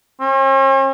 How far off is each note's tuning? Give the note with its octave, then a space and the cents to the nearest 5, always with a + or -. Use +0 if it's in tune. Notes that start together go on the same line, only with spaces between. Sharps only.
C#4 -45